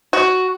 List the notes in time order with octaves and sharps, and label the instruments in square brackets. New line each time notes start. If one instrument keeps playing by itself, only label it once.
[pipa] F#4